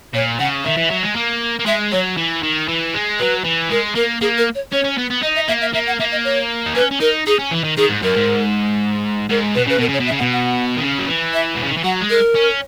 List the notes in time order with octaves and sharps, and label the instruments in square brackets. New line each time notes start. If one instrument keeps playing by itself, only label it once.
[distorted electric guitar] A#2 [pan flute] C#5
[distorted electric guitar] C#3 [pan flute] F#5
[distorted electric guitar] D#3 [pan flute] E5
[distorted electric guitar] E3
F#3
G#3
A#3
A#3
[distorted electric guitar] G#3 [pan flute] E5
[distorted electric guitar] F#3 [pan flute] C#5
[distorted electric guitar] E3
D#3
E3
G#3
[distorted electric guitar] F#3 [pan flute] B4
[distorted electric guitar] E3
[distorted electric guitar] G#3 [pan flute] A#4
[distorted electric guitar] A#3 [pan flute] A#4
[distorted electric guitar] A#3 [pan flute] G#4
[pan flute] A#4
C#5
[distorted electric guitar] C#4 [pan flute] C#5
[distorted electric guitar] C#4
B3
B3
[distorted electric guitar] D#4 [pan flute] D#5
[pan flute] E5
[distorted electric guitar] A#3 [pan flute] E5
[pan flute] E5
[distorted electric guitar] A#3 [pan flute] E5
[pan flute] F#5
[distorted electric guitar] A#3 [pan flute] E5
[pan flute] D#5
C#5
[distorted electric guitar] D#4
[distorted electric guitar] C#4 [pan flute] B4
[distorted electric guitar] C#4
[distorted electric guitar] D#4 [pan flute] A#4
[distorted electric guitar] D#4 [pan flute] G#4
[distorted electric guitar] C#4
E3
D#3
[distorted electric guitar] D#3 [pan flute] G#4
[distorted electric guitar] G#2
[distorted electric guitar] F#2 [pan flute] A#4
[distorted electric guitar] G#2
[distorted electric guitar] G#2 [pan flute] A#4
[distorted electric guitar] B2 [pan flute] B4
[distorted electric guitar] C#3 [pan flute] B4
[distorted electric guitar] B2 [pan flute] A#4
[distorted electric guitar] C#3 [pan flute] C#5
[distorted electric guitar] B2
[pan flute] E5
[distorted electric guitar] C#3
[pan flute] F#5
[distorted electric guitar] B2
[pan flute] F#5
[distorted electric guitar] D#3
C#3
F#3
E3
[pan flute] E5
[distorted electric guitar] B2
C#3
D#3
E3
[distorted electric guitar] F#3 [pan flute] F#5
[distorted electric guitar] G#3
[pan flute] A#4
[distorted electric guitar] C#4